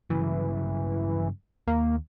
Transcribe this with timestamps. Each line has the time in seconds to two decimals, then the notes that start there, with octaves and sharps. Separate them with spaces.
0.10 G2 C#3 E3 F#3
1.67 D#2 A#3